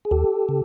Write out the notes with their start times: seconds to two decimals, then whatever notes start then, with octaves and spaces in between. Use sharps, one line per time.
0.05 G#4
0.11 D#2 G4 A4
0.49 C#3